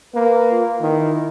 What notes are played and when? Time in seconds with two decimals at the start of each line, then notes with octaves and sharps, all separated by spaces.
0.14 A#3 B4
0.52 F4
0.81 D#3 E4